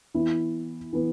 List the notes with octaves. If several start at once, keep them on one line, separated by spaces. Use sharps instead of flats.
E3 B3 E4
E3 B3